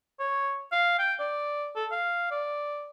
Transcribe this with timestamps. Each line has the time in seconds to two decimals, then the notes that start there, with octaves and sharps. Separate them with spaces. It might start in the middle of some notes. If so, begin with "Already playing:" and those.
0.20 C#5
0.72 F5
0.99 G5
1.19 D5
1.76 A4
1.91 F5
2.31 D5